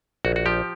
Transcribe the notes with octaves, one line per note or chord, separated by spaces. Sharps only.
A#1 F#4
F#4
F3 G4